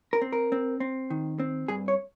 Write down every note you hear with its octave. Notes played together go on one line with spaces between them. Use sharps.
A#4
C4
A#4
C4
C4
D#3
C4
G2 G#4
C#5